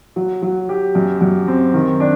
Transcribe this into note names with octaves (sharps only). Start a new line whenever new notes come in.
F#3
F#3
G4
F#2
F#2
C4
D#3
D4